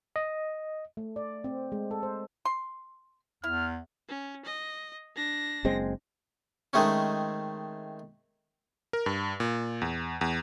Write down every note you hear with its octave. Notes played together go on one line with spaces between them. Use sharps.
D#5
A3
D5
C4
G#3
A4
C5
C6
E2 E4 F6
C#4
D#5
D4 A#6
F#1 G#3 C4
D#3 G#3 A3 C4 C#4
A#4
G2
A#2
E2
E2